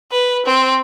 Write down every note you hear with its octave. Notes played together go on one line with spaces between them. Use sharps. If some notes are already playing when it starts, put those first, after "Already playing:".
B4
C4